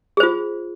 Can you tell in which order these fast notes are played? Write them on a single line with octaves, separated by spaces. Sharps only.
G#4 C5 F4